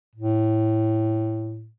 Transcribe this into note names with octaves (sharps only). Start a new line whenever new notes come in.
A2